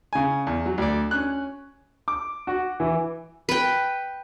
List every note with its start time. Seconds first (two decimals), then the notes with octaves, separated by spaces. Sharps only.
0.13 C#3 G#5
0.47 E2
0.66 F#3
0.78 D2 D5
1.11 C#4 F#6
2.08 D6
2.47 F#4
2.80 E3
3.49 B4 G5